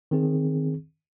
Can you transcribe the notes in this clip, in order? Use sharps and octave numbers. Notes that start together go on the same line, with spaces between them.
D#3 C4 G#4